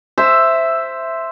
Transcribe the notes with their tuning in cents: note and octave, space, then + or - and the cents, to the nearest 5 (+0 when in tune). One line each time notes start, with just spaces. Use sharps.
C5 +0 E5 +5